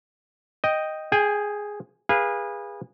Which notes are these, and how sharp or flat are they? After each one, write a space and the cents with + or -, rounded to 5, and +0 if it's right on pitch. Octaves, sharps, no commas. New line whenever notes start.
D#5 +0 G5 +0
G#4 +0 G5 +30
G#4 -25 B4 -25 F5 -10